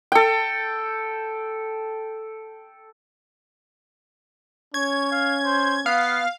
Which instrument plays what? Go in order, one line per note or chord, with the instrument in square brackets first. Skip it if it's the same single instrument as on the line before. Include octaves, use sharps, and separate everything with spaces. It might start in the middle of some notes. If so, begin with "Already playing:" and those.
[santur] A4 G5
[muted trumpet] C#4 [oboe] C#5 [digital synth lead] G#6
[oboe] F5
C5
[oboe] B3 [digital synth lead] F5